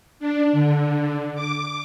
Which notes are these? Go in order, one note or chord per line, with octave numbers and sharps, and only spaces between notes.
D4
D3
D6